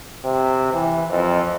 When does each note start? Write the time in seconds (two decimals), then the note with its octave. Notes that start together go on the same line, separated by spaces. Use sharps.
0.24 C3
0.73 E3
1.10 F2